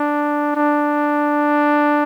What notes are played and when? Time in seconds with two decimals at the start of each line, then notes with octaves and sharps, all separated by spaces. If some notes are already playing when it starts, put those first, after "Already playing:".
Already playing: D4
0.56 D4